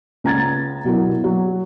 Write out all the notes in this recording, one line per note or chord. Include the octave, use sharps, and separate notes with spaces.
C#2 A#5 G#6 A6
B2 F#3 E4 A#4
F#3